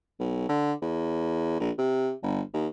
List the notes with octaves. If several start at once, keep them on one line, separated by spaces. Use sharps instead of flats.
B1
D3
E2
A#1
C3
G1
D#2